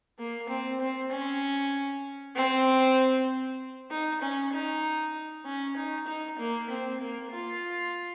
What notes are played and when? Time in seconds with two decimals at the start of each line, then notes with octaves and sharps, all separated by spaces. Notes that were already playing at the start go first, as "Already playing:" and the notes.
0.19 A#3
0.49 C4
0.80 C4
1.11 C#4
2.35 C4
3.91 D#4
4.21 C#4
4.53 D#4
5.45 C#4
5.77 D#4
6.07 D#4
6.39 A#3
6.70 C4
7.00 A#3
7.32 F4